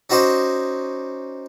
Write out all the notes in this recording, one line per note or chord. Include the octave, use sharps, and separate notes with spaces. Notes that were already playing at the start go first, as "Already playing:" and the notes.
C#4 D#4 F#4 C5 D5 D#5